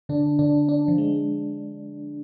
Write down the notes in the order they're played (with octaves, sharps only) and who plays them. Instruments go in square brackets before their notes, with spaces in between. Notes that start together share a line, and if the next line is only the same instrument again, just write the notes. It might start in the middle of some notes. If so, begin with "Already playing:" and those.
[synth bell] D3 [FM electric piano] D4
[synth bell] D3 [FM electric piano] D4
[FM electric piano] D4
[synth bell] F3
[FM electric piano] G#3